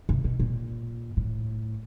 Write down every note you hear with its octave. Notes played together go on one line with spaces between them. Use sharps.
C3
B2
A#2
A2